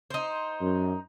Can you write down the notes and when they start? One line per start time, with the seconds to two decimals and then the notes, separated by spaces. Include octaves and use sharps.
0.10 D#4 C5
0.61 F#2